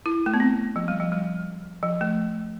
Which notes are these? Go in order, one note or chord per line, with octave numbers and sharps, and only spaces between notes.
E4
A3
B3
C4
F3
G3
F3
G3
F3
A3